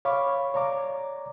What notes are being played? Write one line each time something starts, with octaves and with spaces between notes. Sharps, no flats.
C#5 F5 B5 C#6 D6
C#5 D5 A#5 D6